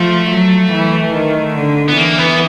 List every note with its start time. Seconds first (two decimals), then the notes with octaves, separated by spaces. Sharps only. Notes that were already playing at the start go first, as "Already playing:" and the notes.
Already playing: F3 A3
0.30 F#3
0.72 E3
1.14 D#3
1.55 D3
1.88 B3
1.96 E3 A#3
2.18 B3